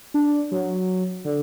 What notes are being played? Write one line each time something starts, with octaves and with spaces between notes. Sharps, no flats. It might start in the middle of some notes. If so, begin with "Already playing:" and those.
D4
F#3
D3